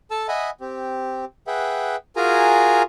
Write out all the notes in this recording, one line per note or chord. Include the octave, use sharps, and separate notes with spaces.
A4 A5 E6
D#5 E5 F#5 G#5 B5 D#6
C4 G4
G#4 B4 E5 F#5 G5
F4 F#4 G#4 A#4 G#5 A#5